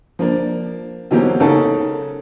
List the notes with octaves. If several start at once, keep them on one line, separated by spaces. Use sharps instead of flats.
F3 A#3 D4
B2 E3 F#3 A#3 C4 G4
G#2 C#3 A4 A#4